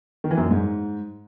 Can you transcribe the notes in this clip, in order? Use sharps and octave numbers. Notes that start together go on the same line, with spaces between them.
D#3
E3
F#2
A#2
G#2